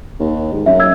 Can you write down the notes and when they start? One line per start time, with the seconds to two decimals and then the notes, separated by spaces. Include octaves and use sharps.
0.20 D#2
0.53 G#2
0.66 F#2 E5
0.79 D#5 E6 G#6